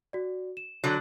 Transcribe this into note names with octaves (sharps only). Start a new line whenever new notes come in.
F#4 D5
E7
D3 F#3